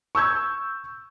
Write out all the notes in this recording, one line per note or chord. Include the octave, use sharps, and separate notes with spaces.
C#6 E6 G6 G#6